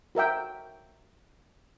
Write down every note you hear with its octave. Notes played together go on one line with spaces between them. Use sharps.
F#4 A#4 E5 G5